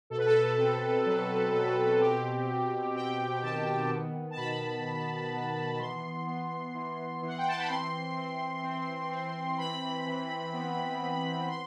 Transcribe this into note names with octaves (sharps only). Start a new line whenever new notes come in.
B2 A4
B4
A4
C4
F#3
B2
C4 G4
C4
C4 G5
D#3 A5
B3
A5
B2 B5
B2
B3
E3 C6
B3
E3
E3
F#5
G5
A5
B5
C4 C6
C4
C4
C4
E3 B5
E3
B3
B3
B3 C6